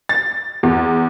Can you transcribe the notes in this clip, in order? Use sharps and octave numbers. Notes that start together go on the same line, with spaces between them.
A6
E2